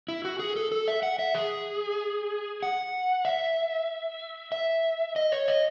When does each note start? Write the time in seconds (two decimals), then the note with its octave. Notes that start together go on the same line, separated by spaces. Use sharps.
0.08 E4
0.25 F#4
0.39 G#4
0.56 A4
0.72 A4
0.88 E5
1.03 F#5
1.19 E5
1.35 G#4
2.63 F#5
3.25 E5
4.52 E5
5.16 D#5
5.32 C#5
5.48 D#5